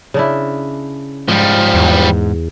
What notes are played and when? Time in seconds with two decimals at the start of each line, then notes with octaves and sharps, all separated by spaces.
0.14 C#3 D4 E4
1.29 G#2 F3 G3
1.74 E2